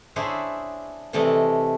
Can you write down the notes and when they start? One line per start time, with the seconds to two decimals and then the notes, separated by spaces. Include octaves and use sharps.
0.16 D4 E4 G#4 C5 C#5 E5
1.13 C3 E3 A3 A4 D5 D#5